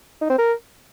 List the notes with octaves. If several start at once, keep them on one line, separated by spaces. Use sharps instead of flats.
D#4
C4
A#4